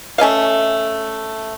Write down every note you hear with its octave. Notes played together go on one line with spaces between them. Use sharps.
A3 C#4 D#5 F5